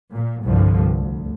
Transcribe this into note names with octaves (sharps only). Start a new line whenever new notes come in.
A#2
C2 G2 D3 F3
D2